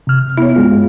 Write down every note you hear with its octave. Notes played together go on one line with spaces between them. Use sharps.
C3 F6
B3 E4 C#5
G2 G#3 F4